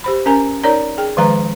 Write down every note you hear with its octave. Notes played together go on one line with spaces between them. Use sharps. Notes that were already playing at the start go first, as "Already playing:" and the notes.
G4 C5 B5
C#4 A#4 G#5 A#5
D#4 A#4 C#5 D5 A#5
G#4 G5
D#3 F3 G#3 B4 F5 A#5